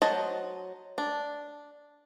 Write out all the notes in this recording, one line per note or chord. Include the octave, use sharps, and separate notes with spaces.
F#3 C5 D#5 A5
D4